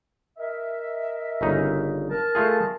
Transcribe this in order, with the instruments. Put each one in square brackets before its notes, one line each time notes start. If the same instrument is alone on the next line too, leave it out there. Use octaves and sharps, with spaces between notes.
[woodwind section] A#4 D#5 E5
[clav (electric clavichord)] G1 C#3 D#4
[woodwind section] A#4 A5
[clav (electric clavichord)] A3 F4 G#4